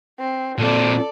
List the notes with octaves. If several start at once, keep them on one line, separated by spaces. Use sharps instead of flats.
C4
A#2 C4 A4 D5